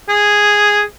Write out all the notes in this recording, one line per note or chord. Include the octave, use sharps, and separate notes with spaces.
G#4